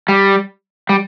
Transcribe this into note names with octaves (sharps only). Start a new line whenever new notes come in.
G3
G3